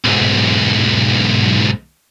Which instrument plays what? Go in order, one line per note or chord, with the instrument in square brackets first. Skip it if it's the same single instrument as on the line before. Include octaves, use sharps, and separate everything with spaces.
[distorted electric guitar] B1 G#2